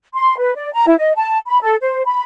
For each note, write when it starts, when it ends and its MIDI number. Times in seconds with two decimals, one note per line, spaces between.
0.13 0.36 84
0.38 0.53 71
0.55 0.72 74
0.73 0.85 82
0.86 0.95 64
0.98 1.11 75
1.15 1.36 81
1.46 1.60 83
1.62 1.76 69
1.81 2.02 72
2.05 2.22 83